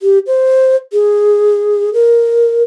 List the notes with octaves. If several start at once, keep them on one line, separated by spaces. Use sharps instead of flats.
G4
C5
G#4
A#4